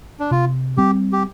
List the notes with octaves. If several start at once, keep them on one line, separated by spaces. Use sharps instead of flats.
D4
C3 F4
G3 C4 G4
G4